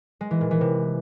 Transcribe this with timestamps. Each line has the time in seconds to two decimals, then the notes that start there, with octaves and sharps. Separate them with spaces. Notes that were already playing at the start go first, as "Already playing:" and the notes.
0.21 G#3
0.31 E3
0.41 A#2
0.51 E3
0.61 C3